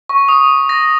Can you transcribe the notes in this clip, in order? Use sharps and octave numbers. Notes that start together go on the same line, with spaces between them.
C#6
D#6
A#6